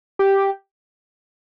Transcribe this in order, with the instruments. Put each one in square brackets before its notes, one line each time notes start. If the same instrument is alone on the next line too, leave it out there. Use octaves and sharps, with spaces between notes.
[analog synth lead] G4